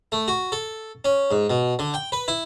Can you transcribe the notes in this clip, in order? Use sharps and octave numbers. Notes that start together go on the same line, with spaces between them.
A3
F#4
A4
C#4
G#2
B2
D3
G5
B4
E4